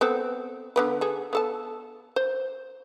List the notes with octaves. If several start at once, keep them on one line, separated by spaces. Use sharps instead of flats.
B3 C4 A4
D3 B3 B4
G#4 A4
B3 A4 A5
C5